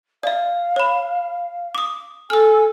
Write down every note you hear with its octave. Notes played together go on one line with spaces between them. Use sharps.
D5 E5 F5
C#5 B5
D6 D#6
A4 G#5 E6 F6